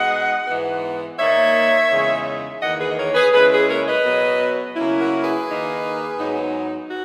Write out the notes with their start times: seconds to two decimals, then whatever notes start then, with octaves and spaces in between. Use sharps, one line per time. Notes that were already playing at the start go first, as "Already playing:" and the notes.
Already playing: B2 G#3 D#4 D#5 F#5
0.47 G#2 E3 B3
1.18 A#2 A#3 D#4 C#5 E5
1.90 E2 C#3 G#3 D#4
2.61 E2 D#3 A#3 D#4 D#5 F#5
2.79 G#4 B4
2.89 D#5
2.97 A#4 C#5
3.15 G#4 B4
3.33 C#3 G#3 C#4 E4 G#4 B4
3.50 G#4 B4
3.68 A#4 C#5
3.86 B4 D#5
4.04 B2 F#3 B3
4.75 C#3 F#3 A#3 C#4 E4
4.99 F#4 A#4
5.23 G#4 B4
5.47 D#3 A#3 D#4
6.18 G#2 F#3 B3 D#4
6.89 F#4